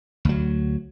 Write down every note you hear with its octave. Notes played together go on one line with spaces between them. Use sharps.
D2 F#3